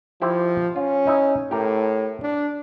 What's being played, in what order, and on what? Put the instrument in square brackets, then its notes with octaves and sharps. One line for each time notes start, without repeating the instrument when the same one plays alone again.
[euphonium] F3 [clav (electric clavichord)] E4 G4 C5
[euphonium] C#4 [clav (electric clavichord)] F4
[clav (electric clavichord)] D#4 E4 E5
[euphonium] A2 [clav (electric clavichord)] G4 A#4
[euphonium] D4